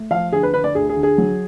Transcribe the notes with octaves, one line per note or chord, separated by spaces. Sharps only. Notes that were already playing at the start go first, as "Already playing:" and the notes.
Already playing: A3
F3 F5
D3 G#4
B4
D3 B4
D5
D2 G#4
G#4
D3
G#4
F#3